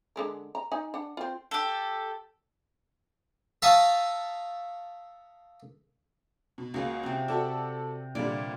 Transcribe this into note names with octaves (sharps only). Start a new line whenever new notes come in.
D3 G#3 A#4
A#5
D#4 G#5
D4 F#5
C4 F4
G4 A4
E5 F5 A5 A#5 C#6 D#6
B2
C#2 A#3 F#4 G#4 B4
C3 C4
F#4 A4 D5 E5
A#2 D3 G3 D5